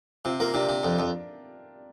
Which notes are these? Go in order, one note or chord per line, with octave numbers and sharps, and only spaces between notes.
C3 C4 F4
A#3 F4 A#4
C3 D4 G4
C3
F2
F2